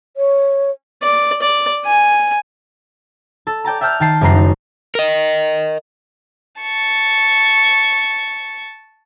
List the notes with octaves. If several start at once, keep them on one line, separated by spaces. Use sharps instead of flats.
C#5
D5
D5
G#5
A4
D5 G5 A5 A#5
E5 G5 A5 F6 G6
D#3 G5 A5 C7
F#1 F#2 G3 A#5 C7
D#4
A#4 D#5
A5 C#6